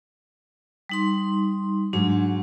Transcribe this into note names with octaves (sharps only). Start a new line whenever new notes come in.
G3 D#4 C6
G#2 F#3 D4